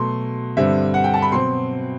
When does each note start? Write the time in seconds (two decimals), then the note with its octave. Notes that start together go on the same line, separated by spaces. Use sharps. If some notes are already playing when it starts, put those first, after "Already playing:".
Already playing: B2 F#3 A3 C6
0.57 G2 D3 G3 C4 E5
0.94 F#5
1.04 G5
1.14 A5
1.22 B5
1.32 B2 F#3 C4 C6